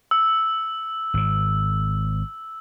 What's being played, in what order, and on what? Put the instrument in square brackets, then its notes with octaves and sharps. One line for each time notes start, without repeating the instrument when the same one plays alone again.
[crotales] E6
[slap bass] G#1 G#2